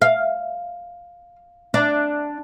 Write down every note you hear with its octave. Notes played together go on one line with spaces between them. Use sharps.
F5
D4